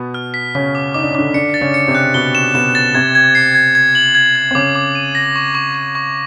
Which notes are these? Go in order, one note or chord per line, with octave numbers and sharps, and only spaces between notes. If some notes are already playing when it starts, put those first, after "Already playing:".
Already playing: B2 B3
F6
B6
C#3 C#4 B6
D6
D#4 D6
D4
C#4
D3 D4 D6
D3 D4 C#7
A6
C#3 C#4
C#7
C3 C4
F#6
B2 B3 G7
E7
B2 B3 E7
A6
C3 C4 G#6
G#6
C7
G#6
G#6
F#7
G#6
G#6
C4
C#3 C#4 D6
D6
D#7
A#6
C#6
C#6
C#6
C#6